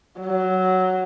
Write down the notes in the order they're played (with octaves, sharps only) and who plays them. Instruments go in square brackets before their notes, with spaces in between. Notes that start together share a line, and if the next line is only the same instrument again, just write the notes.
[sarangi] F#3